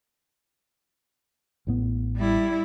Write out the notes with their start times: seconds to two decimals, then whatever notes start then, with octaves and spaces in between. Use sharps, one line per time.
1.67 A1 A2 B3
2.17 G3 E4